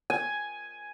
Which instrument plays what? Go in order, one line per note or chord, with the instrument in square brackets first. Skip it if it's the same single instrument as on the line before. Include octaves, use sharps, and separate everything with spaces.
[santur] G#5